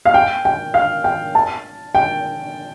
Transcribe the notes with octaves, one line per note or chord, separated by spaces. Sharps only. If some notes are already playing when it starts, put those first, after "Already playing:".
F5
G5
G5
F5
G5
A5
G5